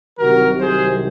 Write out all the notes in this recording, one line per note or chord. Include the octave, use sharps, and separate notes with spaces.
C2 C3 D#3 F#3 F#4 A#4
G#4 C5